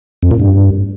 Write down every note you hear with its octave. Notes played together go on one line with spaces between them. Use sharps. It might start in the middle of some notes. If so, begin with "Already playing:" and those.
F2
A#2
G2